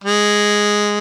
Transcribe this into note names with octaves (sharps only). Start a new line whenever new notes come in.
G#3